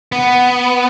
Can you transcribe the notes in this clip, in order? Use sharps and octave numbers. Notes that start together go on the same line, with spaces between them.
B3